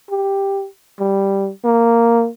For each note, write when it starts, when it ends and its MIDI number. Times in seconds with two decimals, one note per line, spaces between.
0.10 0.66 67
1.00 1.50 55
1.65 2.29 58